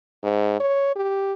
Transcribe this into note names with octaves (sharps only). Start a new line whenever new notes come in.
G#2
C#5
G4